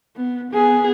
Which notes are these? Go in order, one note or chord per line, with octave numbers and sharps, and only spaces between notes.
B3
B3 G#4